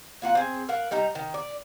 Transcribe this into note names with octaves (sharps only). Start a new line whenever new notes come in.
A#3 F4 F#5
C4 G#4
A#4 F5 F#5
G3 D#4 D#5 A#5
D#3
D5